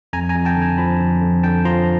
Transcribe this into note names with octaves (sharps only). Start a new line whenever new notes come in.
F2 G#5 A#5
G#5 A#5
F2
G5 A5
D3
G#5 A#5
F3 A5 B5
F2
F2
D3 G5 A5
F3 A#5 C6